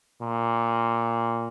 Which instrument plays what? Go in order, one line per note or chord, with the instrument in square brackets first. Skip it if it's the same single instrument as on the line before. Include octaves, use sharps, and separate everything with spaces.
[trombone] A#2